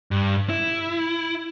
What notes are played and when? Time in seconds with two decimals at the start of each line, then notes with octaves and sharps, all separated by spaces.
0.11 G2
0.49 E4